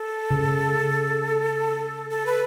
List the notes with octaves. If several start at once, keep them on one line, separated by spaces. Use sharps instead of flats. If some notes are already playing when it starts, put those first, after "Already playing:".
Already playing: A4
C#3
A4
B4